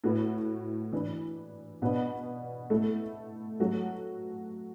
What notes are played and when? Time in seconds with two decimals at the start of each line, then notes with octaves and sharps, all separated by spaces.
0.04 A2 A3 F#4 B4
0.92 E3 D4 B4
1.82 B2 B3 D4 B4
2.70 A3 E4 A4
3.60 F#3 A3 F#4 A4